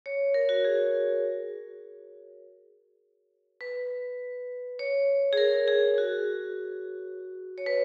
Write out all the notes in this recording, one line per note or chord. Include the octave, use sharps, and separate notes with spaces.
C#5
A#4
F#4
G#4
B4
C#5
G#4
A#4
G#4
F#4
C#5
B4